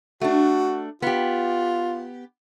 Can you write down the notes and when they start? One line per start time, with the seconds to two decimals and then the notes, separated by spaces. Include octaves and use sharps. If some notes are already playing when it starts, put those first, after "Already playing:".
0.21 A3 D4 F#4
1.02 B3 F4 G4